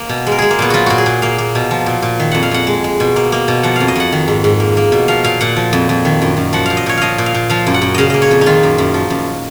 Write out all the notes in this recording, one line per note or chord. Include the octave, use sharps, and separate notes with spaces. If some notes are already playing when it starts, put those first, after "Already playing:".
Already playing: A#3
B2
G#3
A#4
G#3 G#4
A#3
A#2 B3
F#3 F4 F#4
A#2 F#4
G#4
A#2
A#3 F5
A#3
B2
F3
A#2
A#2
D#3
F2 F#5
F5
F2 F#5
G#3
G#3
B2
A#3
A#3
B2
F3 F#5
F2 F5
D#5
F2 F#5
D#3
G#2
G#2
A#3
A#3
B2
F3 F5
A#2 F5
A#2 F#5
F3
F2
F2
D#3
F#2
F#2
F3 F#5
A#2 F5
D#5
A#2 C#5
F3 D#5 F5
A#2
F5
A#2
F3 F5
F#2
F#5
F#2
C#3 D#5 F5
A#3 D#5
C#5
F2
D#4
D#3 F4
F#2
F#2
F3
F#2